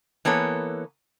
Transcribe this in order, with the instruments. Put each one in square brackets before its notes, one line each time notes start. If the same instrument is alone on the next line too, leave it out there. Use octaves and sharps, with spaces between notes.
[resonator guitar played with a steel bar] E3 A#3 B3 A4 C#5